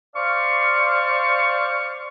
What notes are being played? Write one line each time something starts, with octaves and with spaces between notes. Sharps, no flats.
C5 D5 F5 C#6